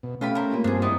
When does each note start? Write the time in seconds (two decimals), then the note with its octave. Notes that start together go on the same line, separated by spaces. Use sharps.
0.03 B2
0.21 A3 C#4 F4 G4 B5
0.35 A#4 C5
0.51 A#3 F4 G4
0.64 G2 C4 D4 G#4
0.82 B3 D#4 E4 C5 D5 G5